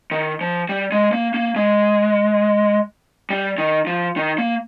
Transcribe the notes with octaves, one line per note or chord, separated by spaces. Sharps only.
D#3
F3
G3
G#3
A#3
A#3
G#3
G3
D#3
F3
D#3
A#3